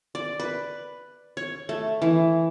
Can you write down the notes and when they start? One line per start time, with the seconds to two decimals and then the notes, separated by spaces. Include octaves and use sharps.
0.15 D5
0.40 B4
1.37 C#5
1.69 A3
2.02 E3